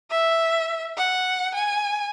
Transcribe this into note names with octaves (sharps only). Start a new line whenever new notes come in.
E5
F#5
G#5